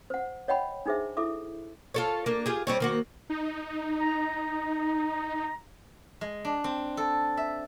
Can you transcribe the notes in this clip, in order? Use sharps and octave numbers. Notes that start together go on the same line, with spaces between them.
C5 F#5
C#5 D#5 F#5 G5 B5
D4 D#4 G#4 C5 E5
E4 A4 E5 D6
F4 A4 C#5
A#3 D4
F4 G4 G#4
G3 C4 C#5
D#3 A#3 F#4
D#4
A#5
G#3
D4
C4
A4
E5